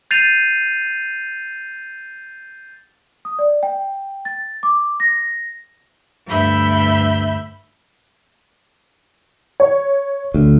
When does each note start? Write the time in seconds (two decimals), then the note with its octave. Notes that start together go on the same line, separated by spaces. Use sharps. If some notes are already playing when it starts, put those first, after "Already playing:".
0.11 G6 A6 C7 D#7 F7
3.25 D#6
3.39 D5
3.63 G5
4.25 A6
4.63 D6
5.00 A#6
6.26 D2 G2 E5 B5 G6
9.60 C#5
10.34 D2